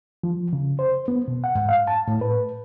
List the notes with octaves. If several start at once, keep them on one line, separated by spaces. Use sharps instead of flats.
F3
C#3
C5
B3
B2
F#5
G#2
F5
A5
A2
B4